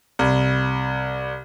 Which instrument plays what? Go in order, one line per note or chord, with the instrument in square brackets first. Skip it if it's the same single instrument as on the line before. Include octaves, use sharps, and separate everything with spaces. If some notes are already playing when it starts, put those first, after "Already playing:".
[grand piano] C2